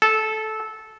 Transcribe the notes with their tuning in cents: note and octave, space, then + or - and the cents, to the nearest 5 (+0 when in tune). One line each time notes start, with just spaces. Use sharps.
A4 -15